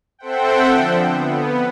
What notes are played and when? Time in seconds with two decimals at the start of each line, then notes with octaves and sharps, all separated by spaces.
0.19 C4 A4 C5 E5 F#5 G5
0.67 D3 F3
1.10 B3